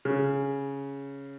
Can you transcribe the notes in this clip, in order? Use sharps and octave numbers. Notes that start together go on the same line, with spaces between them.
C#3